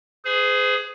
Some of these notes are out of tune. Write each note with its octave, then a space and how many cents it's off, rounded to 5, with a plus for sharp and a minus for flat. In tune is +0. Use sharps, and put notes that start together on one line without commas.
G#4 +5 C5 -45